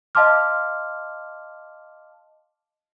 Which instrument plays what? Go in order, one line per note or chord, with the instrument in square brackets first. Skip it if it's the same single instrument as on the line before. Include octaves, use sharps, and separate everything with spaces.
[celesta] D#5 F5 A5 C6 D6 F6